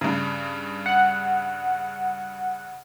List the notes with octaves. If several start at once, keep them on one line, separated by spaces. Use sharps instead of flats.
G2 C#3
F#5